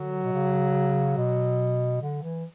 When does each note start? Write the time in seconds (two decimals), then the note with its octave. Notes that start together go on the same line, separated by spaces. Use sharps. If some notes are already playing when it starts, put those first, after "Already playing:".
Already playing: D3 F#3
0.24 B2
0.32 C#3
1.17 B2
2.02 D3
2.23 E3